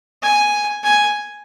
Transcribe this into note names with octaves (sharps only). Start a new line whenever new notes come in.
G#5
G#5